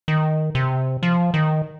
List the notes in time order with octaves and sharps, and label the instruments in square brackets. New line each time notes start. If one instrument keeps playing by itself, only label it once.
[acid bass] D#3
C3
F3
D#3